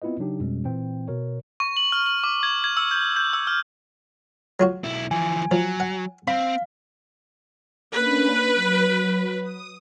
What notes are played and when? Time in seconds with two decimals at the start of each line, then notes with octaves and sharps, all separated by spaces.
0.02 B3 C4 E4 F4 B4 D#5
0.19 C#3 F#3 D4 D#4 G4
0.39 F2 B2 G3 G#3 C#4
0.64 A#2 E3 C4 G5
1.08 B2 A#4 C#5
1.60 C#6
1.77 F#7
1.92 F6
2.06 F#7
2.24 D6
2.43 G#6
2.64 G#6
2.77 E6
2.91 G6
3.16 G6
3.33 E6
3.47 F6
4.60 F#3 F4 F#4
4.84 B1 E4
5.11 E3 F3 G#5
5.51 F3 F#3
5.80 F#5
6.28 C4 F5 B5
7.95 A#3 C#4 D4 B4
8.55 F#3
9.41 D#6